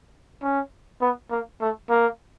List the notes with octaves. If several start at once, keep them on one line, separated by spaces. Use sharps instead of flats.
C#4
B3
A#3
A3
A#3